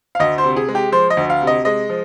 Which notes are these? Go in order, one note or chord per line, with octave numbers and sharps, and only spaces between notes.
F5
D2 D#5
C5
C3
G#4
G#3
G4
F3 C5
D#5
D2
F5
C3
D#5
G#3 D#5
F3